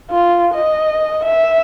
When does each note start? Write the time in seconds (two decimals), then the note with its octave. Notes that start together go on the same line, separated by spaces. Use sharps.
0.11 F4
0.55 D#5
1.24 E5